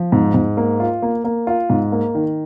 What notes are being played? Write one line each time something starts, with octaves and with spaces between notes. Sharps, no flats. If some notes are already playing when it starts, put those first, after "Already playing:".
Already playing: F3
G#2
G#2
A#3
F4
A#3
A#3
F4
G#2
A#3
D#3